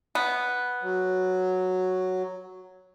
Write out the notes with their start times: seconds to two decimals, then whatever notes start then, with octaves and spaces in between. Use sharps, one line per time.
0.15 B3
0.82 F#3